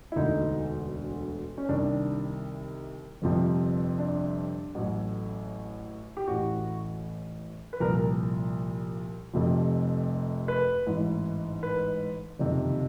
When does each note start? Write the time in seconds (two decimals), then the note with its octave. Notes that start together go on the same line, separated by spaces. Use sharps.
0.12 E4
0.16 E1 D2 D3 D#4
1.58 C#4
1.69 C2 C3 D#3 D4
3.22 G1 F2 C3 F3
3.99 D4
4.74 A1 A2 F#3
6.17 G4
6.27 A1 A2 E3 F#4
7.73 B4
7.80 C2 A#2 F3 A#4
9.33 F1 F2 C3 F3
10.48 B4
10.86 A1 G#2 E3
11.63 B4
12.39 F#1 F2 C3 D#3